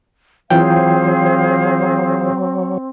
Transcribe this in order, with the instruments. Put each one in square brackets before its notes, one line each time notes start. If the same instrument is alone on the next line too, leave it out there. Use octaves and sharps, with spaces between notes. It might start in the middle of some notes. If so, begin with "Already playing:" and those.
[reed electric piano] E3 F4 G5 [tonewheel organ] F#3 [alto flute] C4 [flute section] G#4 C5 F5